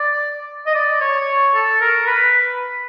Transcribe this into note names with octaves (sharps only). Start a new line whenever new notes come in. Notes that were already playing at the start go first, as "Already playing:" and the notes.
Already playing: D5
D#5
D5
C#5
A4
A#4
B4